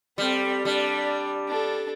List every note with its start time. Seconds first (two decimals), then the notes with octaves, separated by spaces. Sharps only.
0.18 G3 C4 A4
0.65 G3 D4
1.48 D4 A4